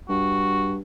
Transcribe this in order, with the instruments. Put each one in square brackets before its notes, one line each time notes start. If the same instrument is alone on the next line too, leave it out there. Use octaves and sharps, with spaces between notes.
[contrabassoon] G2 [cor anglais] F#4